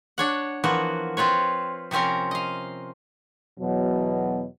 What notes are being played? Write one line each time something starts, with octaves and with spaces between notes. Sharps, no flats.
D4 C#5 F#5
E3 F3 A#3 B3 F#4
C4 F4 B4 C#5
C3 F3 C4 C#4 A#4
D#5 F5
E2 B2 F#3